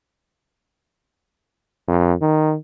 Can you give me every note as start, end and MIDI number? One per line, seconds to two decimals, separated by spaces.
1.88 2.14 41
2.21 2.55 51